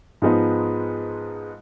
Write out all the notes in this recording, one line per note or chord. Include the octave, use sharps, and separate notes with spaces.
G#2 F3 G#3 B3 D#4